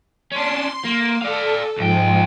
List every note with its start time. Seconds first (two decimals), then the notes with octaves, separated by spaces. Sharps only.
0.32 C#4 D4 C6
0.85 A#3
1.21 A4 D5 F5
1.78 C2 G#2 F3 G#3 G5